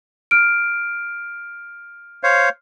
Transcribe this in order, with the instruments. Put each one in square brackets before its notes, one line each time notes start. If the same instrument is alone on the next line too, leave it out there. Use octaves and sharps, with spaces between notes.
[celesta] F6 D7
[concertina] C5 C#5 F5